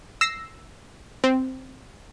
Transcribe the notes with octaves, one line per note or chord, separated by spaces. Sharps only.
E6 A#6 C7
C4